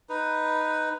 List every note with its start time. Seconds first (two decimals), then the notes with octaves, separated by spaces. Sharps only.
0.09 D#4 B4